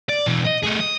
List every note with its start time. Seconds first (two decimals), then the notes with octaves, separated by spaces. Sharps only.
0.09 D5
0.27 B2 E3
0.47 D#5
0.64 A3 G#4
0.80 D#5